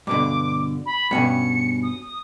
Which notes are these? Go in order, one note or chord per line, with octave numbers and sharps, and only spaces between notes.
G2 B2 D3 D6
B5
G2 B2 C#4 C#7
D#6